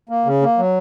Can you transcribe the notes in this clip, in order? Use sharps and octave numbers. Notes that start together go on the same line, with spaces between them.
A#3
C#3
A#3
F#3